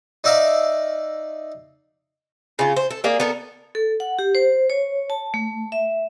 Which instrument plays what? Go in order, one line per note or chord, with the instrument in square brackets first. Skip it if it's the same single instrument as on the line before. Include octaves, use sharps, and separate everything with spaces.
[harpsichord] D#4 D5 E5 F5 A#5
[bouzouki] C#3 F4
C5
A4
A#3 G#4 D5
B3 A4 A#4
[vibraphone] A4
F#5
G4
C5
C#5
A5
A3
E5